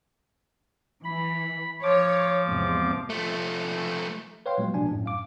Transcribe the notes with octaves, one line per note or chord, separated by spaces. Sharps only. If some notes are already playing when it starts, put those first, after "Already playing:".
E3 B5
F3 C#5 D6
E2 G#2 C3
F3 A3
B4 C#5 F5 G5 C6
A#2 F#3 G#3 B3
A1 B2 F3 D4 G#5
F#2 A2
F5 D6